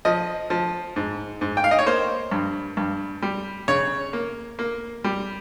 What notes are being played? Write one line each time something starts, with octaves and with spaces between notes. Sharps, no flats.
F3 D#5
F3
G#2
G#2
G5
F5
D#5
C#5
A#3 C5
G2
G2
G3
C#3 C#5
A#3
A#3
G3